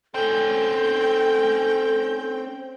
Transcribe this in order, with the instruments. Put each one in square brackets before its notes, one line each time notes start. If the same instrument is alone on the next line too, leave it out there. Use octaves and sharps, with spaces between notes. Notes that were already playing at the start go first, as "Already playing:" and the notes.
[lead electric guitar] C4 C#4 [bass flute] A4 [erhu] G5